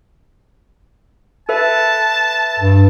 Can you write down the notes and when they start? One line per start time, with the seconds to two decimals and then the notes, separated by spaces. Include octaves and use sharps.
1.49 A4 B4 E5 A5
2.59 G2